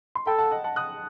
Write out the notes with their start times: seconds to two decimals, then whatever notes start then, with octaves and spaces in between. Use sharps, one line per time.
0.15 C6
0.26 A4 G5 B5
0.38 F#5 A5
0.51 D#5 F#5
0.64 F#5 A5
0.76 D#6 F#6